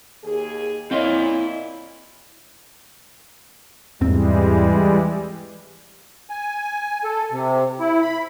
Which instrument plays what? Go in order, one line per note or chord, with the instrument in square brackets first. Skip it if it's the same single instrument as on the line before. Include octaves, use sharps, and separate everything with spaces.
[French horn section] D#2 G#4
[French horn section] A#2 E4 [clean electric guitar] C4 F5 C6 [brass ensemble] C#5 D#5
[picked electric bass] E2 G#2 C4 [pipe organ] E3 G3 G#3
[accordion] G#5
A4
C3
E4
B5